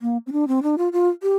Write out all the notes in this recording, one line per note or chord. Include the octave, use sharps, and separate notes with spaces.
A#3
C4
D4
C4
D4
F4
F4
G4